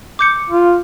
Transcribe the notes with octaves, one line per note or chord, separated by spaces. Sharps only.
D6 G6 C#7
F4